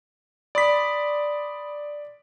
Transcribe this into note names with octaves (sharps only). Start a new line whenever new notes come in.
D5 B5 C6 D#6 B6